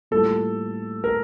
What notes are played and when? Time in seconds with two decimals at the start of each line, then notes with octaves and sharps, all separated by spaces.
0.11 A2 G3 A#3 F4 A4
1.04 A#4